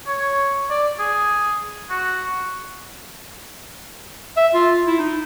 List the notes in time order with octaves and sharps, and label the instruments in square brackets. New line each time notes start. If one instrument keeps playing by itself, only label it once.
[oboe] C#5
D5
G#4
F#4
[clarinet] E5
F4
E4
D#4